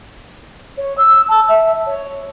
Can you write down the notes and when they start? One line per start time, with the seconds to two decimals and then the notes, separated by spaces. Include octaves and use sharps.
0.77 C#5
0.97 E6
1.28 A5
1.48 E5
1.86 C#5